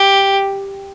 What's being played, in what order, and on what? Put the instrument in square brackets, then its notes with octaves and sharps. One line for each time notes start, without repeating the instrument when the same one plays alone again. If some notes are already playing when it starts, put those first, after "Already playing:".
Already playing: [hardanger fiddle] G4